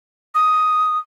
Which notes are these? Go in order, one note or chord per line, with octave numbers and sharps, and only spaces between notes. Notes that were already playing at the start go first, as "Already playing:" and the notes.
D#6